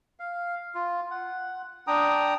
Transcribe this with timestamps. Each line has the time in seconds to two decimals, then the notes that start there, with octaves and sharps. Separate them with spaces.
0.20 F5
0.75 F4
1.11 F#5
1.87 D4 G5 A#5 D#6